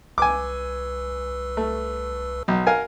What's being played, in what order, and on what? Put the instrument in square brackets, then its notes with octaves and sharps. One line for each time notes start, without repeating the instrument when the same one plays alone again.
[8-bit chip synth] C2 B4 E6 [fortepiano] G#5 D6
[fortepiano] A3
B1
A#4 F5 G#5